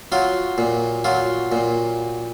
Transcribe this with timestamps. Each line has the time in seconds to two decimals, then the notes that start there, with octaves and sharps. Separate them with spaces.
0.12 F#3 F4
0.58 A#2
1.04 F#3 F4
1.52 A#2